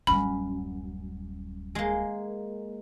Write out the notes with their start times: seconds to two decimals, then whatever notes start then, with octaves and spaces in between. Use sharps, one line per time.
0.07 D1 F#2 G3 B5
1.75 G#3 A#3